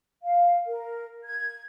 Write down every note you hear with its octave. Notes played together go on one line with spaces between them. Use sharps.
F5
A#4
G#6